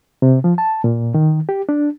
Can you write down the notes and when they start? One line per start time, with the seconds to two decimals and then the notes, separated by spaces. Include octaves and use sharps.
0.22 C3
0.44 F3
0.58 A5
0.84 A#2
1.14 D#3
1.49 G4
1.69 D4